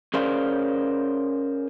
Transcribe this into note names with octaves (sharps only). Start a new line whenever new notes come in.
C#4 G#4 A#4 C5 D5 F5